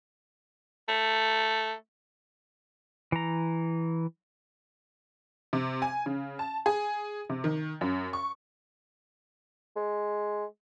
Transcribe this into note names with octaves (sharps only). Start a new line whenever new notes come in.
A3
E3 A#5
C3
G#5
C#3
A5
G#4
C3
D#3
F#2
C#6
G#3